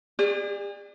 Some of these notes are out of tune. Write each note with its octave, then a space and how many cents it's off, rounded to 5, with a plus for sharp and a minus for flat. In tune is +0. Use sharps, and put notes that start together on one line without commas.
G#4 -40 D5 +20